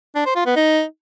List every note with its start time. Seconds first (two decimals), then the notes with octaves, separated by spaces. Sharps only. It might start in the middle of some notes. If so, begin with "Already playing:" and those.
0.15 D4
0.26 C5
0.36 F4
0.46 B3
0.56 D#4